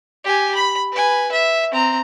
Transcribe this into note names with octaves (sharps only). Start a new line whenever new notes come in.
G4 G#5
B5
B4 G#5
E5
C4 A#5